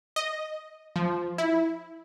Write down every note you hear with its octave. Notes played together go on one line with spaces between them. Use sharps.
D#5
F3
E4